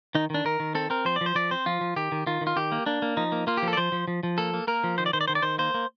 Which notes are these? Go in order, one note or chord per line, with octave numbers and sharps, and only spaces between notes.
D#3 D#4
D#3 D4
D#3 A#4
D#3
C4 A4
C4 A#4
F3 C5
D5
F3
C5
F3 D5
C4 C5
F3 F4
F3
D#3 G4
D#3
D#3 F4
D#3
F4
D#3 G4
A#3
A#3 D4
A#3
F3 D#4
A#3
A#3 F4
G4
F3
A4
D5
F3 C5
F3
F3
F3
A#3 A4
A#3
A#3 A#4
F3
D#3 C5
D5
D#3 C5
D5
D#3 C5
D5
D#3 C5
A#3 C5
A#3